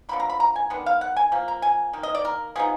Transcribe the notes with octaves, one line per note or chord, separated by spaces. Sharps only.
D3 F3 A#3 B5
A#5
B5
A#5
G#5
D#3 G#3 B3 D4
F5
F#5
G#5
F3 A#3
A#5
G#5
D#3 A#3
D#5
D5
A#4
F3 B3 D#4 G#4